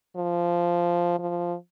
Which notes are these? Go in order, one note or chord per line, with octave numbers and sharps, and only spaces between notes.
F3
F3